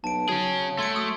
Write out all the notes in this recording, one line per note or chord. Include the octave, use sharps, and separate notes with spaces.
B1 A5 D7
F#3 C#4 G#4 G#6
A3 C6 G#6 D7
C6 C#6 D#6